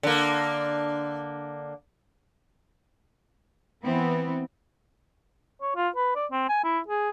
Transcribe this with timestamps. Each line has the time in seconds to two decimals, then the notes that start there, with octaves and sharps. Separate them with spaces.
0.03 D3 A#3
3.83 E3 B3 C4
5.62 C#5
5.76 F4
5.96 B4
6.15 D5
6.31 C4
6.49 G#5
6.64 E4
6.88 G#4